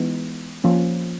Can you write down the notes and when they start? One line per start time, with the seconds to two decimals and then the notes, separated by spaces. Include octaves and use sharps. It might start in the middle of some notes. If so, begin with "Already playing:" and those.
Already playing: E3 G#3 B3 D#4
0.64 F3 A#3 C#4